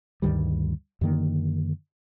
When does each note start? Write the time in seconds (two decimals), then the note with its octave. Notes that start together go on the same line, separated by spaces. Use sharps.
0.22 D2 G2 D#3 G3
1.01 F#2 D3 D#3 A#3